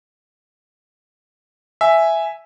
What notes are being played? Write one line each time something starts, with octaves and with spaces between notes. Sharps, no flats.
E5 G#5